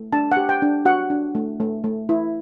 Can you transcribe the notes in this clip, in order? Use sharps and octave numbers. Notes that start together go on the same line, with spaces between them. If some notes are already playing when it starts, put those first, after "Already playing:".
Already playing: A3
D4 A5
F#5
G4
G5
D4
F#4 F#5
D4
A3
A3
A3
E4